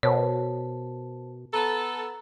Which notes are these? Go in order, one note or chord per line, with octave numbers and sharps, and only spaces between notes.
B2 A#4 C5 C#5 A5
B3 A4 A#5